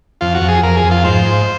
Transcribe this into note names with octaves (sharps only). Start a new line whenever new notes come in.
F2 F4
F#4
F2
G#4
F2 A#4
G#4
F2
F4
G#2 C5
G#2